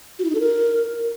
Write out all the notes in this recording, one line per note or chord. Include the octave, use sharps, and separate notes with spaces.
F#4
E4
D#4
A4
A#4